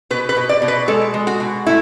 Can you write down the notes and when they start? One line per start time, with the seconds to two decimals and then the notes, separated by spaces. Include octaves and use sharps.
0.10 B2 B4
0.29 B4
0.36 B2
0.49 D5
0.62 B2
0.68 B4
0.88 G#3 A4
1.14 G#3
1.27 F#4
1.40 B2
1.66 A3 E4